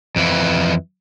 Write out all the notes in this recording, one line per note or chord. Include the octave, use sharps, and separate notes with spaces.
F2 E3